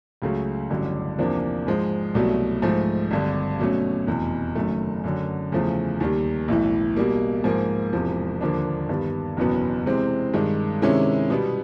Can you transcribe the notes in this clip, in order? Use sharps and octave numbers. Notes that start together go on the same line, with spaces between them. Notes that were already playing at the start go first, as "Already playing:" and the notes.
C#2 C#3 F#3 A3 C#4
A1 G2 D3 F#3
E2 C3 F3 A#3 D4
G#2 F3 G#3
C2 B2 F#3 A3
G#2 F3 A3
G#1 G2 D3
B2 F#3 A3 C#4
F1 E2 B2
F#1 F#2 D#3 F#3 A3
F#2 D3 F#3
E2 C#3 F3 A3
D#2 D#3 G3
B1 A2 E3
B2 G3 A#3
G#2 F3 A#3
E1 E2 C3 F3
D#2 D3 F3 A#3 D4
G2 D#3 G3 B3
F#1 E2 B2 F#3 B3
C3 E3 G#3 C4
G2 D#3 G#3
C3 D#3 G#3 C#4 E4
B2 G3 B3